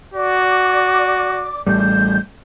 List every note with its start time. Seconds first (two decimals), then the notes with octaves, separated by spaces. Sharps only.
0.14 F#4 D5 D6
1.67 A1 A2 G3 G6